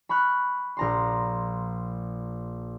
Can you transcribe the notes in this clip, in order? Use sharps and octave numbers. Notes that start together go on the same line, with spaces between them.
B5 C#6 F6 F#6
A#1 A#5 C6